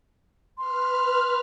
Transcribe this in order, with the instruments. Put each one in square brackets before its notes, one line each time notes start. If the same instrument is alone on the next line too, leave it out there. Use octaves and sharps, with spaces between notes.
[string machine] B4 F6 [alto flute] C6